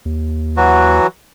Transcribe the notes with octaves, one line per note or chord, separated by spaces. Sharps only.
D#2
E3 F#3 F#4